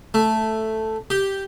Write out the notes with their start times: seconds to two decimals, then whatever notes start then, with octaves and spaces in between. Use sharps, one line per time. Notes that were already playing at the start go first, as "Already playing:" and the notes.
0.14 A3
1.10 G4